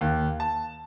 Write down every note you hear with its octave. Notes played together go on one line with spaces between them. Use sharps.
D#2
A5